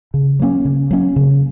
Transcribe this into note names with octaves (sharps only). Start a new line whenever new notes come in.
C#3
F#3 A#3 C#4
C#3
F#3 A#3 C#4
C#3